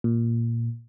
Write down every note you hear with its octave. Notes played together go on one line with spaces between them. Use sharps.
A#2